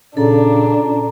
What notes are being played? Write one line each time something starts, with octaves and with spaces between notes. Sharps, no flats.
A#2 C#3 D4 A4 A#5